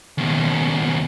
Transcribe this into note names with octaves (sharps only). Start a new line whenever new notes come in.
D#2 B2